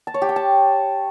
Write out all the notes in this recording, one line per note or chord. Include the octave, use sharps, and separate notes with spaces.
A5
C#5
G4
G5
A5